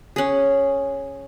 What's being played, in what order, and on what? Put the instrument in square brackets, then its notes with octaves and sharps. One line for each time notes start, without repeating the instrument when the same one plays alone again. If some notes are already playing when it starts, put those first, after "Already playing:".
[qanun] C#4 G#4